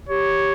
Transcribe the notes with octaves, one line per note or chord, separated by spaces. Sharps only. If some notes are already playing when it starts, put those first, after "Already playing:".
G4 C#5